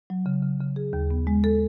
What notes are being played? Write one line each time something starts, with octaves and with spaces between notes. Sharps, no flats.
F#3
C#3
C#3
C#3
G#4
D#2
B3
G#3
A4